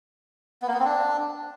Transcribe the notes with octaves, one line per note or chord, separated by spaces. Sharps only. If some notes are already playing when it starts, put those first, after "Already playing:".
B3
A#3
B3
C4
D4